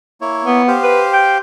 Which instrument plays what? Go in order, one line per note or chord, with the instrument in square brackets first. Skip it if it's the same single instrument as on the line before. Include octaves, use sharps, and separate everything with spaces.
[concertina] A#3 E4 C#5
[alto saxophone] B3
[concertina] G4 C5 F5
[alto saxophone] B4
G5